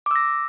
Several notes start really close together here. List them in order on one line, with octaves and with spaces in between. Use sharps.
D6 E6 A#6